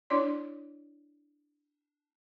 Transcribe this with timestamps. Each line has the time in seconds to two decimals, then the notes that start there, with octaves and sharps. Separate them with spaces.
0.10 D4 E4 C#5 D5 C6